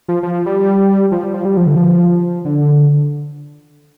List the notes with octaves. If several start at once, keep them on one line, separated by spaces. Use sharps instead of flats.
F3
F3
G3
F3
G3
F3
G3
F3
D3
F3
D3